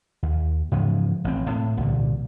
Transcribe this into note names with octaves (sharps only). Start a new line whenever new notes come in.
D#2
G#2 C#3 E3 F3
A1 C4
A2
C2 A#2 D3